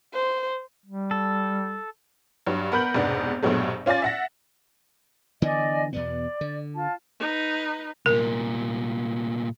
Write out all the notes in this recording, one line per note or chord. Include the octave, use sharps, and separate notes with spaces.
C5
G3
A4
G2 F#3
B3 A#4 B5 G6 F#7
F1 G#2 B2 B3 D4
A#1 G2 B2 F#3 G#3 A3
C#4 F4 D5 G#5 A6
E5 F#5 A#6
D3 E3 B3 D5 D#5 G#5
E2 B2 B3 D5
D3
F4 A5
D#4 B4
C2 A#2 A#4